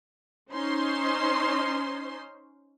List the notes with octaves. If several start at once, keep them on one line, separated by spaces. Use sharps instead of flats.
C#4 D#4 C5 C6